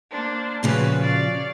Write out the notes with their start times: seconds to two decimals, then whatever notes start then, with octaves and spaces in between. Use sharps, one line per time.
0.11 A#3 D4 C5
0.63 A#2 C#3 F3 F#4 B4 G#5
1.00 C#5 D5 F5